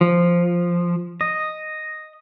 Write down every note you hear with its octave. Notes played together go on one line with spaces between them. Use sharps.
F3
D#5